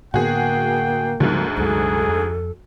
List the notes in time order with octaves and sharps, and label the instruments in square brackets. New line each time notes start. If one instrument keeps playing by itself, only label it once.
[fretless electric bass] A2 D3 B3 [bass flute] A#3 [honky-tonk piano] F#4 G#4 [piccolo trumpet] G5
[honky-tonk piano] D2 G#2 [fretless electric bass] C#3 F3 G3
[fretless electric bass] C2 F#2 G#3 [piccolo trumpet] G#4 [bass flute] A4
[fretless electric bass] F2